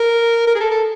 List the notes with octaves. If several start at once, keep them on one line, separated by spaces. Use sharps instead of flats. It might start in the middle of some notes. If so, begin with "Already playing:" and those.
Already playing: A#4
A#4
G#4
A4
A4